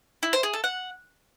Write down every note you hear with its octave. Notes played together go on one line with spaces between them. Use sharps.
E4
C5
G#4
A4
F#5